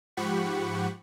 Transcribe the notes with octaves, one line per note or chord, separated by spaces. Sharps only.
G#2 F3 G4 F#5 B5 C#6